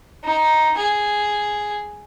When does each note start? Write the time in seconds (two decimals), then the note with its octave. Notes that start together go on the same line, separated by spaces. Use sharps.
0.24 D#4
0.77 G#4